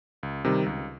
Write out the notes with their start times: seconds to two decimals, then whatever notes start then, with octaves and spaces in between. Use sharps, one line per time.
0.23 C#2
0.44 C3 D#3 G3
0.66 C#2